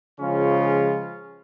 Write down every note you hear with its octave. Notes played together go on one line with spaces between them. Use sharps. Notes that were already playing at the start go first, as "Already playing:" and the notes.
C#3 F3 G#3 C#4 F4